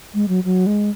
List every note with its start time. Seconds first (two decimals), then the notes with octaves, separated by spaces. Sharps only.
0.14 G#3
0.28 F#3
0.44 F#3
0.67 G#3